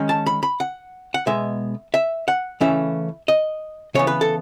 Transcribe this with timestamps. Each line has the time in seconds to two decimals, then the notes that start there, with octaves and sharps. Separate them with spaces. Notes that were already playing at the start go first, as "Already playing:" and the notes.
Already playing: D#3 G#3 C#4
0.09 A5
0.26 B5
0.43 B5
0.60 F#5
1.14 F#5
1.27 B2 G#3 B3 E5
1.94 E5
2.28 F#5
2.61 C#3 E3 A3 C#4 E5
3.28 D#5
3.95 C#3 E3 B3 C#5
4.07 B4
4.21 A4